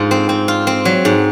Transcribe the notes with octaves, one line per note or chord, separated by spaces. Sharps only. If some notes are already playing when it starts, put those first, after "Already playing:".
Already playing: G#2 F4
C4
C4
F4
C4
F#3
G#2